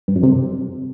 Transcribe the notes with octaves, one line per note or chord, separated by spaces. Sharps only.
G2
F#2
C3